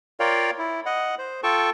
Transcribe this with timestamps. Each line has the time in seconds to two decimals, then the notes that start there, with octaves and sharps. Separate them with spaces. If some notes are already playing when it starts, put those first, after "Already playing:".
0.20 F4 A#4 C#5 D5 F5 G5
0.58 E4
0.86 D#5 F#5
1.19 C5
1.43 F4 A4 G5 A5 C#6